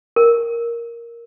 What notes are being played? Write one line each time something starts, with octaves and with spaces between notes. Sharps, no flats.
A#4